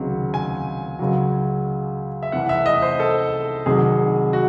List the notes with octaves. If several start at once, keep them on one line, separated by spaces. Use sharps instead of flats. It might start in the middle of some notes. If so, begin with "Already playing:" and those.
Already playing: C#2 C3 D#3 F#3
G#5
C#2 C#3 F#3
E5
C2 C3 E3 F#5
E5
D#5
C5
A4
C2 C3 D#3 F#3 G#4
F#4